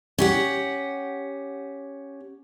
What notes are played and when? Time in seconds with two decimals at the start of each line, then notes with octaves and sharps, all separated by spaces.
0.18 C#4 G4 F#5